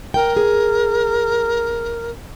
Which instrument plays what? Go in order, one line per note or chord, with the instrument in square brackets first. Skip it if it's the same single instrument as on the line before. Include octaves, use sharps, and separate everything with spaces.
[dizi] A#4 [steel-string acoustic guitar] G5
[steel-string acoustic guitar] G#4